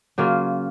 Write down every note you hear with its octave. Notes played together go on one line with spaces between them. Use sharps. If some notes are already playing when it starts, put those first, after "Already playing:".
C#3 F#3 A#3 F4